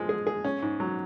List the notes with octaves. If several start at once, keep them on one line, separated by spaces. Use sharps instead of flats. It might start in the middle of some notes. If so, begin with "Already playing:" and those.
Already playing: F3 G#3
G#4
G#4
C#4
G#2
F#3